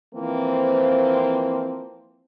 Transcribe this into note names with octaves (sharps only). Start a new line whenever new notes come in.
E3 F3 A#3 C4